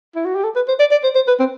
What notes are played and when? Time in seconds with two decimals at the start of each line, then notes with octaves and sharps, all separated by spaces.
0.16 E4
0.25 F#4
0.35 G4
0.44 A4
0.56 B4
0.68 C5
0.80 D5
0.91 D5
1.04 C5
1.15 C5
1.28 B4
1.40 C4